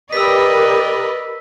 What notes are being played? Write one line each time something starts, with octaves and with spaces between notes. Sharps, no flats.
G4 A#4 B4 D5 D#5 E6 B6